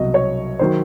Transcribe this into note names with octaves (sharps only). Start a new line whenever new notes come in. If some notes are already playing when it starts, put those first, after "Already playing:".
Already playing: C2 B2 F#3 D#5
C#5
D#3 F#3 C5